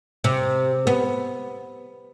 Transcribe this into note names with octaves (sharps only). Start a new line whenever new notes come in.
C3
B3